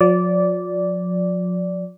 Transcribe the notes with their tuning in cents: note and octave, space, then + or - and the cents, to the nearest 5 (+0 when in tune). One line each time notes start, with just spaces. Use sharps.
F3 +45 D5 -15